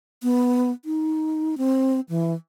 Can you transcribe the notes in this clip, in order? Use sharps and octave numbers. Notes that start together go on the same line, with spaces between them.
B3
D#4
C4
E3